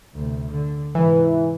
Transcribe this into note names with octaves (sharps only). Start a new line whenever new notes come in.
D2 C3
D3
G#2 C3 E3